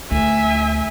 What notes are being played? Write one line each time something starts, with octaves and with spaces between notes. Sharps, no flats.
D2 E5 G#5